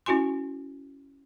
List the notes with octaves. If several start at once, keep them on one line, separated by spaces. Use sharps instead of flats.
C#4 E4 F#4 G#5 C6